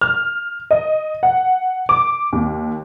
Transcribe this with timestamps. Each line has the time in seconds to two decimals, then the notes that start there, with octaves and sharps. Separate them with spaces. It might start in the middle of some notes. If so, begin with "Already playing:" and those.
0.01 F6
0.71 D#5
1.23 F#5
1.89 D6
2.33 D#2